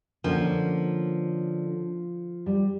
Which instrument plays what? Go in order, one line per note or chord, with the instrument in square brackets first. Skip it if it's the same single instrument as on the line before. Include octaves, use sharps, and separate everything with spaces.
[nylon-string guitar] D3 A#3 C#4 [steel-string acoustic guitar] F3
[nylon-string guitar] G3